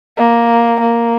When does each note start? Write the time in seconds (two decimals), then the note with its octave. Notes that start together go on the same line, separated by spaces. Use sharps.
0.18 A#3
0.81 A#3